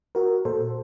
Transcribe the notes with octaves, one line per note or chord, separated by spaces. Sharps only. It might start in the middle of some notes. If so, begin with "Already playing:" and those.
F#4 A#4
A#2 A4 C5